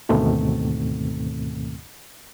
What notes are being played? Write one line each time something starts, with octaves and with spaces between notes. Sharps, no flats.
D2 G#2 B2 D#3 A3 C4